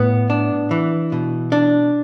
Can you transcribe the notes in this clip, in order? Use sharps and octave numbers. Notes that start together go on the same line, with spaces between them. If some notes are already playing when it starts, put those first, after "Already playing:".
Already playing: A2 B3
D4
E3
B2
D4